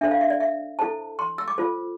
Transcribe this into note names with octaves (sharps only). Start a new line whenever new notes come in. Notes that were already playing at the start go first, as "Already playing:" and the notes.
D4 A4 C5 E5
F5
E5
D5
E5
E4 A4 C5 A5
C6
E6
D6
F4 A4 C5